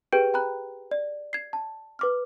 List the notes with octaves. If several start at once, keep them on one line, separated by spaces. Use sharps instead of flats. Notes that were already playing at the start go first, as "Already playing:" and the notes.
G4 G#4 B4 G5 G6 D7
G5 A#5 B5 F#6
D5
G#6 C7
A5
B4 D6 F6